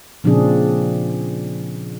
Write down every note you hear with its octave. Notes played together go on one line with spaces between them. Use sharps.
A#2 C#3 F3 C4 D4 G#4